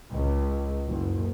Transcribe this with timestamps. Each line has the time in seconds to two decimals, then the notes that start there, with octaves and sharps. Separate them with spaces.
0.12 C#2
0.87 F#1